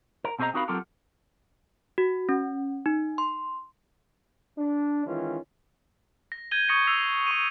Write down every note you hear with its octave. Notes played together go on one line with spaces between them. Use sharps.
A#4
B2 C4 G#4 C5 D#5 A#5
C4 D#4 F#4 A#4 F5 B5
F#3 C4 F4 G4 A4 A#4
F#4
C#4
D#4
C6
D4
D#3 E3 G#3 C#4 F4
A#6
G6 G#6 D#7 G7
C#6 D#6 G#6 A#6 C#7 G7
E6 A#6 C7 F7
C#6 D#7